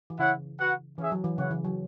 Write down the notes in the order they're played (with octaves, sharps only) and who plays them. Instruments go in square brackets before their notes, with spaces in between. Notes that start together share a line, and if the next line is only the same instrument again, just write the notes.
[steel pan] E3
[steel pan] C#3 [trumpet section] E4 C#5 F#5
[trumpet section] F#4 B4 F#5
[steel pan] E3 [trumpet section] C#4 G#4 E5
[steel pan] F#3
E3
[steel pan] C#3 [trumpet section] E4 C#5 F#5
[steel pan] E3
F#3